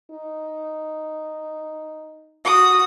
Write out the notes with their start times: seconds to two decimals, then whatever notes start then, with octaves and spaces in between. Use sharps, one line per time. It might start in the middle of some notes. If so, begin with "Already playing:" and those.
0.11 D#4
2.45 F#4 D#6